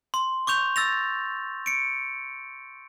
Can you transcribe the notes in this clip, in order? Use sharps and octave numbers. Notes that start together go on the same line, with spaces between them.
C6
C#6 D6 G6 F7
E6 A6 A#6 F7
C#7 D7